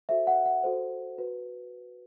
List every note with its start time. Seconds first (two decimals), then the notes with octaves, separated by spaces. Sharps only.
0.09 F#4 A4 C5 E5
0.27 F#5
0.45 F#5
0.63 F#4 A4 C5
1.18 F#4 B4